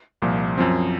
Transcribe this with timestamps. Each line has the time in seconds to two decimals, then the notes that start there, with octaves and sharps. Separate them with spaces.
0.22 C2 A#2 F3
0.58 F#2 F3 C4